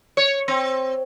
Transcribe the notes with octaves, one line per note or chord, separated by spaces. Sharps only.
C#5
C4